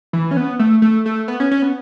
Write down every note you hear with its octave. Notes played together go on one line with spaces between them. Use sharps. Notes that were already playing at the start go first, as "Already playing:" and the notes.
E3
C#4
B3
A3
A3
A3
B3
C#4
C#4
B3